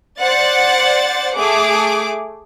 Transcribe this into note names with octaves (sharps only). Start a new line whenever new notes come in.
C5 D5 F#5 A6
A3 G#4 D6